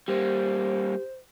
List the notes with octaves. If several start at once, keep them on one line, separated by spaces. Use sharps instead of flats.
G3 A#3 G4 C5